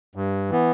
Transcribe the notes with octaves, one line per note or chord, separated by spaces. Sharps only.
G2
E3 B3